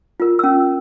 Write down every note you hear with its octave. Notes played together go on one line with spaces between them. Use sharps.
F4 A#4
C#4 E6